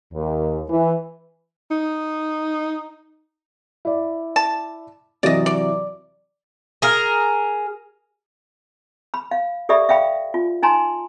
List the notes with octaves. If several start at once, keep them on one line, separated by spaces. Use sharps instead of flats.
D#2
E3
D#4
E4 D5
A5
C3 E3 F#3 D5 D#5
D5
G#4 A#4
B5
F5
G4 A4 D5 E5 B5
E5 F5 G5 B5
F4
D#4 G#5 A#5 C6